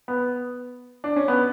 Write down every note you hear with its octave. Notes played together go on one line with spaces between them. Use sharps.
B3
D4
C#4
B3